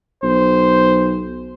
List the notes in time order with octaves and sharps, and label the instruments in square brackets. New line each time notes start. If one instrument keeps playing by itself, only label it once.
[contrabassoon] B1 [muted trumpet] C5